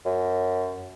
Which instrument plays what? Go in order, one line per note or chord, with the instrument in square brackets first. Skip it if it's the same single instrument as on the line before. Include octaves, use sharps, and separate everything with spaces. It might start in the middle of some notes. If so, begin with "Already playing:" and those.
[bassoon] F#2